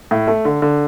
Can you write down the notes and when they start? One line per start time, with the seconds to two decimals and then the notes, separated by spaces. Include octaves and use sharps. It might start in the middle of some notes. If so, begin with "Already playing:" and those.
0.11 A2
0.27 A3
0.45 D3
0.62 D3